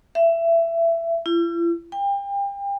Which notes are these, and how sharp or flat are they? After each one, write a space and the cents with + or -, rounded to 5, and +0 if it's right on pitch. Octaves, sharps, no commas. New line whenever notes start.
E5 +20
E4 +45
G5 +35